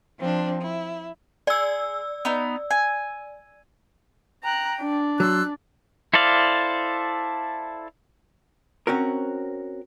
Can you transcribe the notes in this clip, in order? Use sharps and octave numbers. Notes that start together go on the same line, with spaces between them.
F3 C4 D4
E4
G#4 D5 E6
B3 D#4
G#5
G5 A#5 F#6
D4
F#3 C6 E6 F#6
E4 A4 C5 D5 F5
C4 C#4 F#4 A#4